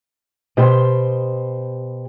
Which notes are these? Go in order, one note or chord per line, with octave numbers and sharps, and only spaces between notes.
B2 G4 C5